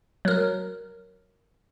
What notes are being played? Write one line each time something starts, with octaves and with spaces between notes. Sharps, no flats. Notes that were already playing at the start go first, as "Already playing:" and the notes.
F#3 A#4